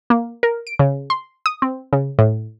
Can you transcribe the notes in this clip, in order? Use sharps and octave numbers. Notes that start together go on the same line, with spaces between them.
A#3
A#4
D7
C#3
C6
D#6
C4
C#3
A2